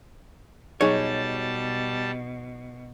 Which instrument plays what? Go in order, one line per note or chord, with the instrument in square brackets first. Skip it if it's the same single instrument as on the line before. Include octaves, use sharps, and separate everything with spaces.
[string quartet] B2 [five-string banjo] F#3 D#4 G#4 [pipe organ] G3 A5 [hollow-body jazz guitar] C#5